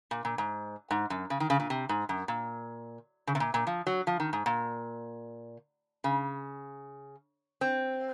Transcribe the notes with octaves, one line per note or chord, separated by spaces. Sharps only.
A#2
A#2
G#2
G#2
F#2
C#3
D#3
C#3
A#2
C3
G#2
F#2
A#2
C#3
C3
A#2
A#2
F3
F#3
F3
D#3
G#2
A#2
C#3
C4